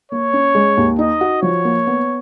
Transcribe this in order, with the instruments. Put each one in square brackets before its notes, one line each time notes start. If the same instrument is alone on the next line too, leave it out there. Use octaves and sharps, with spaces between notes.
[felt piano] A#3 [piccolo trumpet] C#5
[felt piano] C#4
G#3
D#2
[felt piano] D#4 [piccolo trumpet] D#5
[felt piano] F#4
[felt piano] F3 [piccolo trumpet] C#5
[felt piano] A#3
B3